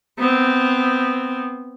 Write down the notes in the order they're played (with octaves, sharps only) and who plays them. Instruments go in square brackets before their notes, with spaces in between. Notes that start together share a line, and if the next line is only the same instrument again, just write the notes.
[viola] B3 C4